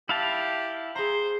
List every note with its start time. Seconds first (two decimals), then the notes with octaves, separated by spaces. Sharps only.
0.09 E4 G4 F5 A5
0.96 G#4 C5 A#5